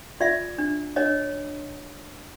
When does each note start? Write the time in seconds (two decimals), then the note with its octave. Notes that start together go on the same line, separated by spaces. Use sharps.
0.20 F4 D5 E5
0.58 D4
0.96 D4 C#5 D#5